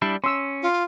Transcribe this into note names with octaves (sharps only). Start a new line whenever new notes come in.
G3 D4 E4
C#4 C6 E6
F4